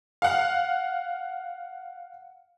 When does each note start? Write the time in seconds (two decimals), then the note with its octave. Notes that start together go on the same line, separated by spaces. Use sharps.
0.22 F5 F#5